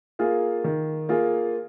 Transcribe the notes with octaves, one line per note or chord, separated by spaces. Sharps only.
A#3 F4 G#4
D#3
A#3 F4 G#4